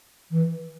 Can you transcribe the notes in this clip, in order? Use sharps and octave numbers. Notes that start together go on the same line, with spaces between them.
E3